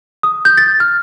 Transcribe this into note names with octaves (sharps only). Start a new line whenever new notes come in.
D#6
G6
A6
F6